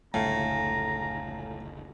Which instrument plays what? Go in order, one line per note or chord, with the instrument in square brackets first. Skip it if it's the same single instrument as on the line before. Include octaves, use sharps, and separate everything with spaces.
[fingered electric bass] F1 C#2 D3 [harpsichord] A2 [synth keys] A4 F5 G#5 [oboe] A#5